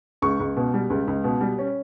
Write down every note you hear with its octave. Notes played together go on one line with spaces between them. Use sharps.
C#2 C#6
C#2
B2
G3
C#2
C#2
B2
G3
C#4